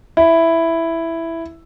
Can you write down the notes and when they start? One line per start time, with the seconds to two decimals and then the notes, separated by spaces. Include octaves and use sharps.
0.17 E4